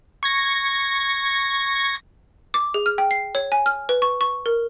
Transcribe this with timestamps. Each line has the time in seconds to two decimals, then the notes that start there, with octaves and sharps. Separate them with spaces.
0.23 C#6 G#6 A#6
2.54 D6
2.74 G#4
2.86 F6
2.98 G5
3.11 C7
3.35 C#5
3.52 G#5
3.66 F6
3.89 B4
4.02 C#6
4.21 C#6
4.46 A#4